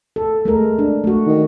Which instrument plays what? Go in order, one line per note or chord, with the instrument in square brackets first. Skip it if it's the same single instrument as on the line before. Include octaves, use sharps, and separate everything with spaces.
[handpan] A4
G#3 A3 A#4
D4
A3 F#4
[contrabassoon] D#3